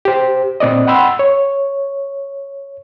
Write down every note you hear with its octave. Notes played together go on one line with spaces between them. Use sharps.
G4 C5
A#2 C4 D5 D#5
F#5 G5 B5 C6 E6
C#5